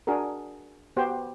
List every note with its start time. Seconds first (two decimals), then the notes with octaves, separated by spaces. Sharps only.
0.07 D4 F#4 G#4 A#4
0.97 B3 F#4 G4 C5